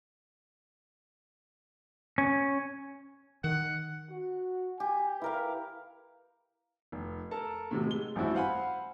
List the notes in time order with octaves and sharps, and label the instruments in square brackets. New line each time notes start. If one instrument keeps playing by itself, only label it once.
[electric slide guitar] C#4
[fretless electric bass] D#3 [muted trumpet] F#5
[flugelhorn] F#4
[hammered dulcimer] G4 [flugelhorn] G#5
[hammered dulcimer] E4 A#4 F5 [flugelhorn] B4
[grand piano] F1
A4 A#4 A5
A2 C3 F#3
G#3 G7
A1 G2 C4 E4 F#4
C5 F5 F#5 G#5 B5